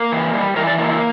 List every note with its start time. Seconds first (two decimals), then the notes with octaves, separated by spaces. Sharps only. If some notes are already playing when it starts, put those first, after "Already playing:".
Already playing: A#3
0.12 E3
0.34 G3
0.56 E3 A#4
0.67 D5
0.78 A#3 E4
0.90 E4